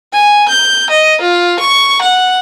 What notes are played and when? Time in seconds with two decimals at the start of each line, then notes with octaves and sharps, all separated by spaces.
0.13 G#5
0.48 G6
0.90 D#5
1.21 F4
1.60 C#6
2.02 F#5